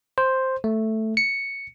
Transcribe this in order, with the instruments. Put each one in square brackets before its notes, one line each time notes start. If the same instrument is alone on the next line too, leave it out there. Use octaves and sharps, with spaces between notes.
[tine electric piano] C5
A3
C#7